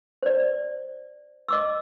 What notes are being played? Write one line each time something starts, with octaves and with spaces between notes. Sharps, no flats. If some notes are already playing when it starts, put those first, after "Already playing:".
C5 D5
D#5 D6 E6